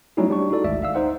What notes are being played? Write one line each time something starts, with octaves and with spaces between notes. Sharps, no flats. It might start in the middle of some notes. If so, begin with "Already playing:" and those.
F#3 G3 A3 C#4 D#4 E4
G3 D4 C#6
D#4 E4 F#4 A4 D5
G#1 D2 G#3 D5 E5
E5 F5 E6
D#4 C5 F#5